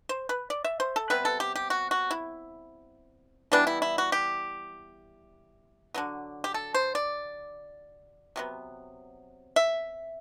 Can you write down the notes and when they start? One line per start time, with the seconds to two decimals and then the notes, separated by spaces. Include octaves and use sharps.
0.09 C5
0.29 B4
0.50 D5
0.65 E5
0.80 C5
0.96 A4
1.10 C3 G3 B3 B4
1.25 A4
1.40 G4
1.56 G4
1.70 F#4
1.91 F#4
2.11 E4
3.52 E3 G3 B3 D4
3.67 E4
3.82 E4
3.98 F#4
4.12 G4
5.94 D3 F#3 B3
6.44 G4
6.54 A4
6.75 C5
6.95 D5
8.36 C3 F#3 B3
9.56 E5